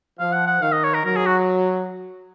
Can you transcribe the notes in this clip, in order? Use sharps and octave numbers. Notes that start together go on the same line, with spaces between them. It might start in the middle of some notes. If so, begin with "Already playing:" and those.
F3 F5
F#5
F#5
D#3 F5
D#5
C#5
A#4
F#3 A#4
G#4
F#4